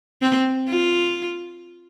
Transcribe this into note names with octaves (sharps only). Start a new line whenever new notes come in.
C4
F4